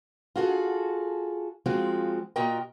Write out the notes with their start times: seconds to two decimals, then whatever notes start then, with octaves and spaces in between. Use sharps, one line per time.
0.36 F4 F#4 G#4 A4
1.66 F3 G#3 C4 F4 F#4
2.36 A#2 F4 F#4 A#4 D#5 G5